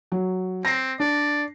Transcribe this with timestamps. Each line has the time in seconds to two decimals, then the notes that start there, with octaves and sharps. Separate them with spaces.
0.12 F#3
0.65 C4 A#6 C7
1.00 D4 D5